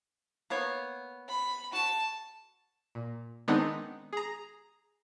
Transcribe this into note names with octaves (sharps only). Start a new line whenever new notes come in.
A#3 B3 C#5
B5
F#4 A5
A#2
D#3 G#3 B3 C4 D4 D#4
G#4 A#5